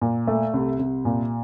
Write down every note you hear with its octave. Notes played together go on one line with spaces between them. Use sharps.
A#2
A3
C2
C2
A#2